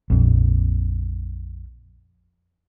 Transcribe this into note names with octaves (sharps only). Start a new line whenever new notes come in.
A#1 F2